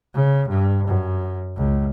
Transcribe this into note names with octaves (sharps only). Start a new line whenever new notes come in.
C#3
G2
F#2
C#2